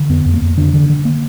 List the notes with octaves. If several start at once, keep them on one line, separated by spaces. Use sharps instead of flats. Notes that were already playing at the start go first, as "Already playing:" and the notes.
Already playing: D3
F2 B3
F2
A#3
F2
D3 D4
D3
D3
A#3